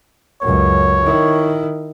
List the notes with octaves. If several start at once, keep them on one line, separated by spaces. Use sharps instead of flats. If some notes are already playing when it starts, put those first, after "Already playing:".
C#2 F#2 C#5
D#3 E4